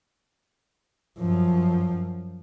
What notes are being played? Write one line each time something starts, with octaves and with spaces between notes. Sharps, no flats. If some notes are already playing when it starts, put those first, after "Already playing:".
F#2 F3